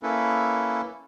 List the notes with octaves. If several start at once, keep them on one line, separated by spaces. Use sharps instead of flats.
A#3 C#4 E4 A4 B4